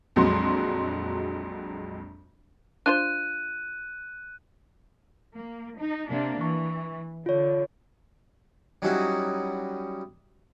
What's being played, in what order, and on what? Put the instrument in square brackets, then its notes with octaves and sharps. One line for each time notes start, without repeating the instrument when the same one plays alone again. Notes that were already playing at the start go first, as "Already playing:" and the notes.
[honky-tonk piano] A#1 F2 F#3 G#3 F#4 C6
[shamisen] D4 F4 C5 [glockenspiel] F#6 D#7
[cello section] A#3
D#4
C3 A#3 D4
[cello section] E3 [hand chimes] C#6
[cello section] D3 [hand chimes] F4 C#5
[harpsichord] F#3 G3 C#4 D#4 E4 F#4